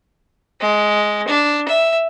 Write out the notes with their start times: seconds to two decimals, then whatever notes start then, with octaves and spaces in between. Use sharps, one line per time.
0.61 G#3
1.28 D4
1.68 E5